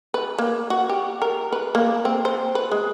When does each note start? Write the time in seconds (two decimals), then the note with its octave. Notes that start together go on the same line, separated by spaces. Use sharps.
0.14 B4
0.38 A#3
0.70 F#4
0.90 G4
1.22 A#4
1.52 B4
1.75 A#3
2.05 C4
2.25 C5
2.55 B4
2.72 G#3